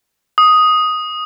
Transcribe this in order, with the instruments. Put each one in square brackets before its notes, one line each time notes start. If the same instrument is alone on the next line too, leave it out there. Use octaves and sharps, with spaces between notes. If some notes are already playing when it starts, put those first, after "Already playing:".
[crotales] D#6